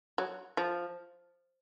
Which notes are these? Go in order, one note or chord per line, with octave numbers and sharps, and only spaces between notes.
F#3
F3